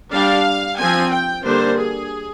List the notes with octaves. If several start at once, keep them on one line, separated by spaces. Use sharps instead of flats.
G3 D4 F5
F3 C4 G#5
G5
D3 G3 A#3 D4 C5
G#4